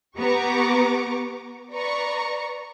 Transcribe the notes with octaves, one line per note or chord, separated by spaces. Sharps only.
B3 G4 B4 A#5 C#6 D6
B4 D5 A#5 C#6